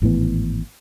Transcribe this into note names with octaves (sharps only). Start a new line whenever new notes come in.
G#1 A2 E3 B3